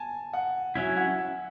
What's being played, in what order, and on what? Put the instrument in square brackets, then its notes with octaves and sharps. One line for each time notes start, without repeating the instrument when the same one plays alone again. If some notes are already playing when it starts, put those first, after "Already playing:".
Already playing: [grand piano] G#5 A5
F#5
[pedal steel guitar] F#3 C#4 E4 [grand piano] E5
[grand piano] F#5
E5